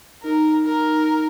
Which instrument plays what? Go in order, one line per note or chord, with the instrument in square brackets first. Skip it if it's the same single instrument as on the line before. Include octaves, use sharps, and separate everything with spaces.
[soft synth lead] D#4 [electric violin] A#4
[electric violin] A#4